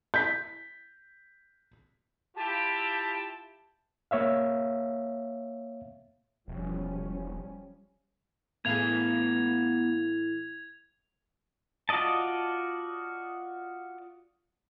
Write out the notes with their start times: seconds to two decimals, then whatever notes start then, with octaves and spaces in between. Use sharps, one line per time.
0.14 G6 B6
2.36 E4 F4 G4 A5
4.11 A#3 C#5 E5 F5
6.48 E1 F3 G3 C#4
8.65 A2 E3 B3 G#4 A4 F5 G#6 F7
11.89 F4 F#4 D5 D#5 A5